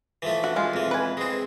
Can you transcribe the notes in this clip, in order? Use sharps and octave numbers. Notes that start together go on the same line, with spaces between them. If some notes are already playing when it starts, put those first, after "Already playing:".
E3 F3 A3
F#4
G#3 F4
F2 E3
B4 G#5
G#3 C4